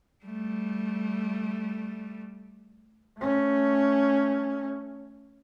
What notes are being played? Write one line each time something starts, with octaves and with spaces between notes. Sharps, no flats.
G3 A3
A3 C#4